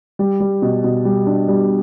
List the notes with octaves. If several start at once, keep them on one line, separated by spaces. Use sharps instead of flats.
G3
G3
B2
B2
G3
D4
G3